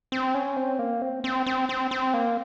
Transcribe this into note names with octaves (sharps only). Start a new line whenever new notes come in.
C4
C#4
C4
A#3
C4
C4
C4
C4
C4
A#3